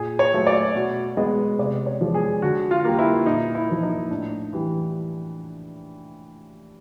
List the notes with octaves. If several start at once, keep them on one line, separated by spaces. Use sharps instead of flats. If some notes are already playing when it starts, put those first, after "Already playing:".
Already playing: A#2 G#4
C#5
F#3 A3
D5
B2
G#3 B3 D#5
C3 D5
C#5
F3 G#3 B3
G#4
D3 F#4
F4
G3 A#3
E4
A#2 D#4
E4
F3 A#3
D#4
A2 D4
E3 G3